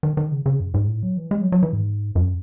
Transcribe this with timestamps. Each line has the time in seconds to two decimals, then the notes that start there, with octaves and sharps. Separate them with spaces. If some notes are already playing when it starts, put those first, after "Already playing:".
0.03 D#3
0.17 D#3
0.32 C#3
0.46 C#3
0.60 F#2
0.74 G#2
0.88 A2
1.03 F#3
1.17 E3
1.31 G#3
1.41 F#3
1.52 F#3
1.63 E3
1.73 G#2
2.15 F#2